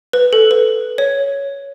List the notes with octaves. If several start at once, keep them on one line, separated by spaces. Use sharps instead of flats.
B4
A4
B4
C#5